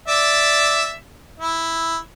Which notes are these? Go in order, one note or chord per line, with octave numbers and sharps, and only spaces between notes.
D5 E5
E4